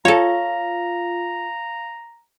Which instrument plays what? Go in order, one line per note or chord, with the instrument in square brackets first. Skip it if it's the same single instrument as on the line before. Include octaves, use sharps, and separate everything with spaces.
[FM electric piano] F4 [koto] A4 C#5 [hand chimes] F5 [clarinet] A#5